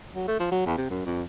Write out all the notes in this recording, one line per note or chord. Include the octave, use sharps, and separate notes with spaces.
F#3
A3
F3
F#3
E2
C3
F#2
F2